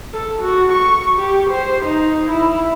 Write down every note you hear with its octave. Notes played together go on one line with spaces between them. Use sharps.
A4
F#4
C#6
G4
C5
D#4
E4